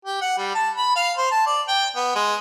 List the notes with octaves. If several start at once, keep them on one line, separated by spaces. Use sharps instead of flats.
G4
F#5
G3
A5
B5
F5
C5
A5
D5
G5
B3
G#3